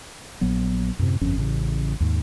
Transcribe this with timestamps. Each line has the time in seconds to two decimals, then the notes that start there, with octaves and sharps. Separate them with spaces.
0.41 A#1 F#3 B3
0.99 F#2 A2 C3
1.21 G1 F2 C#4
1.38 A1 C#3
2.00 D#2 G#2